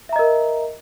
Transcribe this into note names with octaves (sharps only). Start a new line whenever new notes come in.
A#4 D#5 E5 A#5